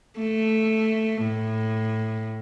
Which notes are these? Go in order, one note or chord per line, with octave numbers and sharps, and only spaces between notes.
A3
A2